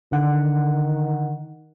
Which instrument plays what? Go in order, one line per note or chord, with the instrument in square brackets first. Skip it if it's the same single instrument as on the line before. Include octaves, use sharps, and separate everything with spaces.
[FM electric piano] D3 F#5 [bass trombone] D#3